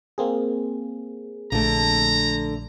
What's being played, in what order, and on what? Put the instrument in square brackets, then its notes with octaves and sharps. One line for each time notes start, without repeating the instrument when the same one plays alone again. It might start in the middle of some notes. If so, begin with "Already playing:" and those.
[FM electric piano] A#3 C4 G#4
[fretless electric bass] A#1 [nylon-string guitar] D3 A3 [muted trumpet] A#5